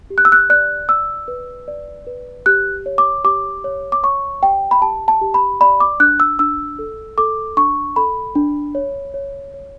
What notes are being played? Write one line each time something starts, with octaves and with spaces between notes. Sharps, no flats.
G4
F#6
E6
F#6
D5 F#6
D5 E6
B4
D5
B4
G4 F#6
C#5
D6
G4 D6
C#5
D6
C#5 C#6
G4 G5
B5
G4 A5
A5
G4
B5
D5 B5
D6
D4 F#6
E6
D4 E6
A4
A4 D6
D4 C#6
A4 B5
D4
C#5
C#5
C#5